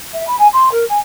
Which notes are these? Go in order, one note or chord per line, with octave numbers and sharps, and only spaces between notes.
E5
B5
G#5
C6
A#4
G#5